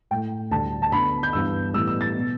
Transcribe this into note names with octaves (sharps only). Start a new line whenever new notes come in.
A2 A3 G5
D2 D3 G3 A5
A5
D2 D3 B3 B5
G6
G2 E3 B3 E6
A2 E3 G3 B3 E6
E6
A6
B2 B3